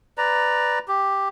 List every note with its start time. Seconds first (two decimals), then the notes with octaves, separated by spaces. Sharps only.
0.18 B4 D5 A#5
0.88 G4